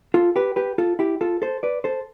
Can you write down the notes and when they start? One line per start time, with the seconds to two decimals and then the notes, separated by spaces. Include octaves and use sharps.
0.14 F4 A4
0.36 G4 B4
0.56 G4 B4
0.78 F4 A4
0.99 E4 G4
1.21 F4 A4
1.42 A4 C5
1.63 B4 D5
1.84 A4 C5